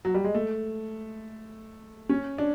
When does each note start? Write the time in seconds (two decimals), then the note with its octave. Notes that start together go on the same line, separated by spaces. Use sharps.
0.05 F#3
0.15 G3
0.24 G#3
0.34 A3
2.09 C#4
2.38 D4